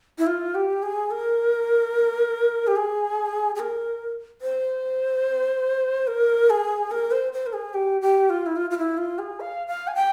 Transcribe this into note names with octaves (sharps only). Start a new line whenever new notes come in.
E4
F4
G4
G#4
A#4
G4
G#4
G#4
A#4
C5
A#4
G#4
A#4
C5
C5
A#4
G#4
G4
G4
F4
E4
F4
F4
E4
F4
G#4
F5
F5
G#5
G5